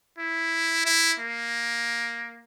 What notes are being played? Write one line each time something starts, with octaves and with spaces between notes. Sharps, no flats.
E4
E4
A#3